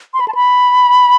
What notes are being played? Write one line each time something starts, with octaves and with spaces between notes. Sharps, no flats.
C6
B5
A5
B5